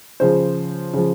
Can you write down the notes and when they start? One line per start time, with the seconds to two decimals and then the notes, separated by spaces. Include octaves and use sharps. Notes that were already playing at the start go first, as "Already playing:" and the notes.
0.20 C#3 F3 C5
0.93 C#3 F3